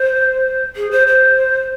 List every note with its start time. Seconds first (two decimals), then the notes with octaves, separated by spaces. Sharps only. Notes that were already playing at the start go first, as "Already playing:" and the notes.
Already playing: C5
0.76 G#4
0.91 C5
1.07 C5